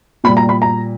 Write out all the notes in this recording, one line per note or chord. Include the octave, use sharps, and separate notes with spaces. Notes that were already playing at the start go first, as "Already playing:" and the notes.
A#2 G3 B5
A#5
B5
A#5